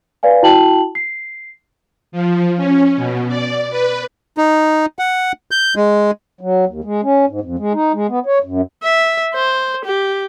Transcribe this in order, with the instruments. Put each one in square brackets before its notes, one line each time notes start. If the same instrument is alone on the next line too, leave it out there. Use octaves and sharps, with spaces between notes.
[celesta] B4 D5 F5 G#5
E4 F#4 G5 A5 F#7
C7
[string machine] F3
C#4
B2
D5
B4
[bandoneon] D#4
F#5
G6
G#3
[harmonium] F#3
D#2
G#3
C#4
G#2
F2
G#3
D#4
G#3
B3
C#5
F#2
[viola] E5
C5
G4